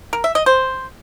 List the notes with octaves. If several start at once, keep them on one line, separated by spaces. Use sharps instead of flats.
A#4
E5
D#5
C5